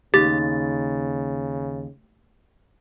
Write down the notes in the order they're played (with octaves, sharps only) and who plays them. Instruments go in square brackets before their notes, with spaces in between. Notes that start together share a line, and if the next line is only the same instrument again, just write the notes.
[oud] D#2 [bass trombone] C#3 [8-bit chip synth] G4 [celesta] A6